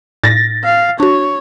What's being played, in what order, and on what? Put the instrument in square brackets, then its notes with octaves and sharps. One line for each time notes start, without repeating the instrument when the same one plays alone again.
[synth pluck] A2 [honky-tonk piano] A6 A#6
[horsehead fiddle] F5
[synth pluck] D4 F#4 [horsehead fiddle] C#5